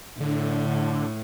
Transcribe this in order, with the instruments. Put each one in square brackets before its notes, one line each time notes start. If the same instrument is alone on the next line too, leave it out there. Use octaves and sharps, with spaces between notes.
[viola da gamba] A2 [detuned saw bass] D3